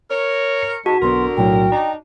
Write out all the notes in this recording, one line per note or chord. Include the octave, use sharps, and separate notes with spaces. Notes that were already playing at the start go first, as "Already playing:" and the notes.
A#4 C#5
C#7
G#2 G#3 D#4 F#4 A5
B1 D3 B3 A#4 C6
B1 A2 F#3 G5
D4 D#4 A#5